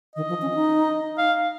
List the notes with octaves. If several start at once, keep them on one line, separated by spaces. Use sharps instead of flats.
D#3 D#5
F3
C#4
D#4
F5